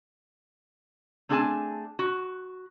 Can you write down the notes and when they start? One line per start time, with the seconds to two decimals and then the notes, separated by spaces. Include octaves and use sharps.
1.29 A3 C4 D4 G#4 G#5 A5
1.99 F#4